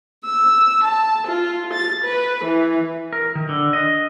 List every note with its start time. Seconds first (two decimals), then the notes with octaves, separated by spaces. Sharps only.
0.23 E6
0.83 A5
1.27 F4
1.73 A6
2.03 B4
2.43 E3
3.13 A#4
3.35 D#3
3.49 D3
3.73 D#5